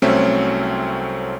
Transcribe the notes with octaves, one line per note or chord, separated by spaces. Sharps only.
C2 F#3 A3 C4 C#4 E5